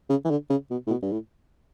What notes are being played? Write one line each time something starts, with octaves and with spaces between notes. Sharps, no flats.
C#3
E3
D3
C#3
B2
A2
B2
G2
A2